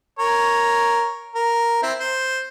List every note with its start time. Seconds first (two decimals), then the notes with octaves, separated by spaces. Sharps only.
0.19 A#4 C#5
1.35 A#4
1.83 C4 E4
1.99 C5